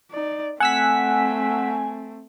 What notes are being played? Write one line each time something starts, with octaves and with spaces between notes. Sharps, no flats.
D#4 D5
A3 C4 F#5 G#5 E6 B6